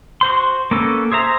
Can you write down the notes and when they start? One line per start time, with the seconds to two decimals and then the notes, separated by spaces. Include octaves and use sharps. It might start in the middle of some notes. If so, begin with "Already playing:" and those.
0.21 F#4 C5 C6
0.71 A#3 B3 C#4 A4
1.12 G#4 C5 E5 A#5